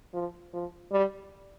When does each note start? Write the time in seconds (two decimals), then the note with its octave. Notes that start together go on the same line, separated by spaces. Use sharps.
0.14 F3
0.54 F3
0.92 G3